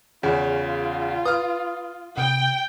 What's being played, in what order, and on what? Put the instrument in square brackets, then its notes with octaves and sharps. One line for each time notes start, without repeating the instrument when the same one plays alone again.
[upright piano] E2 C#3 [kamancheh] F4
[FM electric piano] B4 [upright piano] D#6 F6
[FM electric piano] C3 [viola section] G5